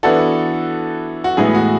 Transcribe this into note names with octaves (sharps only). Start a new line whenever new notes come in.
E3 B3 D4 F#4 A4
F#4
A2 E3 G#3 B3 G#4
F#4